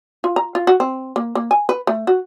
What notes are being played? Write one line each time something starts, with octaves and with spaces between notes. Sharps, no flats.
F4
A#5
F4
F#4
C4
A#3
A#3
G#5
B4
A3
F#4